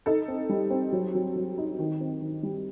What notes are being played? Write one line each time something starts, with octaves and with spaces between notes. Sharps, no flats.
D#4 A4
C4
G3
C4
F#3
F#3
F#3
D#4
D#3
C4
D#3
G3